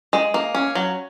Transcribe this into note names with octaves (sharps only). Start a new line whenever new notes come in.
G#3
A#3
C#4
F#3